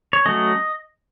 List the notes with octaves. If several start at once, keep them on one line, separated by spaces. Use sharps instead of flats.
C#5
F#3 A3 C#4 D#5